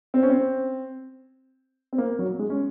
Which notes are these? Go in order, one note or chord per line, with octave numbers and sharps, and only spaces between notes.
C4
C#4
C4
C4
A#3
F#3
G#3
C#4